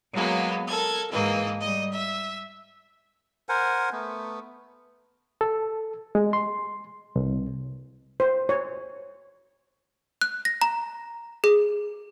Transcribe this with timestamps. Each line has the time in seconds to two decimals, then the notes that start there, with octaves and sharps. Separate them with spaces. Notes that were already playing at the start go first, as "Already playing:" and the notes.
0.12 F#3 G#3 A#3 B3
0.67 A4 A#4 G#6
1.11 G#2 E3 A#3 D#5
1.60 G3 D#5
1.92 E5
3.49 A#4 C5 F#5 G#5
3.92 A3 B3
5.41 A4
6.15 G#3
6.33 C6
7.16 C2
8.20 C5
8.49 C#5
10.21 F#6
10.45 A#6
10.62 A#5
11.44 G#4